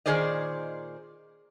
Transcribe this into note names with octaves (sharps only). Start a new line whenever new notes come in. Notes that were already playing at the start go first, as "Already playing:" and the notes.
A#2 D#3 G#4 C5 D5 D#5